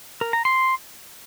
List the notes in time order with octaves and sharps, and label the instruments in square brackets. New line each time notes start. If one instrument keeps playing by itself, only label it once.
[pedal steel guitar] A#4
A#5
C6